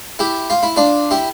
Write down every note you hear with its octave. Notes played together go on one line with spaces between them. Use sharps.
E4 G4
F4
E4
D4 F4
E4 G4